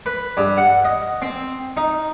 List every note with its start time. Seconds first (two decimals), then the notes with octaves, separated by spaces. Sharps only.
0.06 B4
0.37 G2
0.57 F#5
0.85 D#5
1.22 C4
1.77 D#4